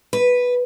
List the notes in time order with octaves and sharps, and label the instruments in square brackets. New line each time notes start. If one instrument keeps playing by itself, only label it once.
[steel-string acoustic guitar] B4